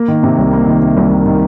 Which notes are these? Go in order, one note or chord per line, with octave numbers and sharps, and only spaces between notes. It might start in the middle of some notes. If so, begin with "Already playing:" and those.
Already playing: A#3
D#3
C3
C2
A#3
D#3
C3
C2
A#3
D#3